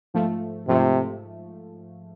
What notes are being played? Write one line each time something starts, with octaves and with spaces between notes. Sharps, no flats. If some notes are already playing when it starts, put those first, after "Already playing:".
G#2 F3 A3
G#2 C3 F3 A3